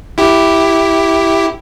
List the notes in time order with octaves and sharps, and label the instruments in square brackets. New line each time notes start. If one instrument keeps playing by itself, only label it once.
[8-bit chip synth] E4 G4